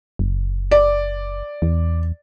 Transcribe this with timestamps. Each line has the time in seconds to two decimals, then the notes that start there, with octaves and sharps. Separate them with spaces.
0.19 F#1
0.71 D5
1.62 E2